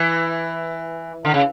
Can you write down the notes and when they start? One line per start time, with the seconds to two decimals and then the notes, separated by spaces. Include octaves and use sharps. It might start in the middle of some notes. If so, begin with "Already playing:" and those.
Already playing: E3
1.25 D3
1.34 C#3